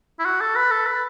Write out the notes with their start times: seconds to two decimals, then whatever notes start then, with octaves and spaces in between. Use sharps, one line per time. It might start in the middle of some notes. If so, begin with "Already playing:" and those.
0.19 E4
0.25 F#4
0.41 A4
0.56 B4
0.71 A4
0.87 B4